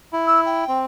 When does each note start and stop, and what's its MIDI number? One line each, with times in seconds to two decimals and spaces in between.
0.13 0.64 64
0.26 0.40 88
0.46 0.78 79
0.68 0.85 60